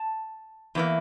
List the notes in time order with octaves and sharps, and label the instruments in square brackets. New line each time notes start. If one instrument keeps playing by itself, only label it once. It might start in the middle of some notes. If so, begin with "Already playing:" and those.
Already playing: [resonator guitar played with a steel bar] A5
E2 E3 A#3